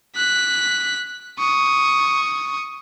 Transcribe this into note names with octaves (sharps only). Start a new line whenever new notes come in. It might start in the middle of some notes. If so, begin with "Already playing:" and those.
F#6 B6
C#6 D#6